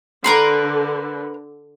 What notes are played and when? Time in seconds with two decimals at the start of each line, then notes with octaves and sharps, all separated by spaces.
0.24 D3 A#4 B4 C6